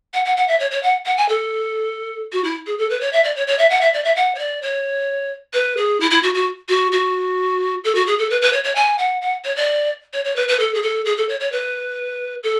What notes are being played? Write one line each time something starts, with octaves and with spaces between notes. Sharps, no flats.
F#5
F#5
F#5
E5
C#5
C#5
F#5
F#5
G#5
A4
F#4
E4
G#4
A4
B4
C#5
E5
D5
C#5
C#5
E5
F#5
E5
D5
E5
F#5
C#5
D5
C#5
B4
G#4
E4
E4
F#4
F#4
F#4
F#4
A4
F#4
G#4
A4
B4
B4
C#5
C#5
G#5
F#5
F#5
C#5
D5
C#5
C#5
B4
B4
A4
G#4
A4
G#4
A4
C#5
C#5
B4
A4